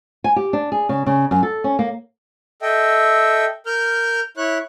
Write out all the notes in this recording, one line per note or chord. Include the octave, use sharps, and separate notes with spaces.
G#5
G4
D4
G#4
C#3
C#3
F#2
A4
C#4
A#3
A4 D#5 E5 G5
A#4 F6 G6
E4 C#5 F#6